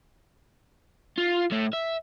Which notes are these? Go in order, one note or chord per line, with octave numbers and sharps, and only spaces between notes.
F4
A2 A3
E5